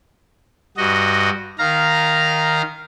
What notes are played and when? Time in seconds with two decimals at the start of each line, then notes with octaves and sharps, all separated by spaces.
0.77 G2 F#4 D#5
1.59 D#3 F5 A#5